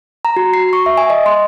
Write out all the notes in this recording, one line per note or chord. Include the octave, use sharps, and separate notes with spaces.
A#5
F#4
C7
C#6
E5
G#5
D#5
C6